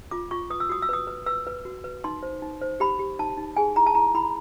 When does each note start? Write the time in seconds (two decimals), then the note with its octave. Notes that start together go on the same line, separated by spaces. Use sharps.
0.11 F4 D6
0.31 F4 C#6
0.50 B4 D#6
0.60 E6
0.69 F#4 D#6
0.82 E6
0.89 B4 D#6
1.07 B4
1.26 B4 E6
1.47 B4
1.65 F#4
1.84 B4
2.04 D#4 C6
2.23 C5
2.42 D#4
2.62 C5
2.80 G4 B5
2.99 G4
3.19 D#4 A5
3.37 D#4
3.57 G#4 G#5
3.76 E4 A#5
3.86 A5
3.95 E4 A#5
4.15 E4 B5